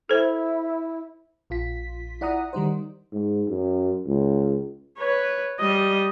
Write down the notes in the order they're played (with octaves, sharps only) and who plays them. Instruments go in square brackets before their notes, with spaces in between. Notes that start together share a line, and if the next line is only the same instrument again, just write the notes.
[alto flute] E4 [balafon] A4 C5
[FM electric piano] A#1 F4 B6
E4 D5 F#5 A#5 D#6
D#3 G3 D#4 C5
[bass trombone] G#2
F#2
C#2
[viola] B4 C#5
G3 D#5